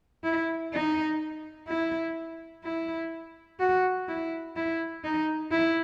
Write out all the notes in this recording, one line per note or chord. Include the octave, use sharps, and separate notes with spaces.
E4
D#4
E4
E4
F#4
E4
E4
D#4
E4